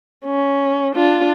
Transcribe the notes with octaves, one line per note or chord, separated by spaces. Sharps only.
C#4
D4 F4